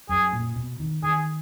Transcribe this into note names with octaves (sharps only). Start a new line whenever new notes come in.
F#2 G#4
A#2
B2
D#3
D#3 G#4